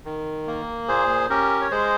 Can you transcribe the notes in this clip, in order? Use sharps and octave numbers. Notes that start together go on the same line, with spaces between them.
D#3
A#3
A#2 G#4 C5
C#4 G4 A#4
C#5
G#3 G#4 C5